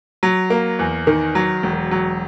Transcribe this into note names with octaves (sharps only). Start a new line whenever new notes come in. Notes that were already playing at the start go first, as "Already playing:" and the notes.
F#3
A#3
E2
D#3
F#3
E1
F#3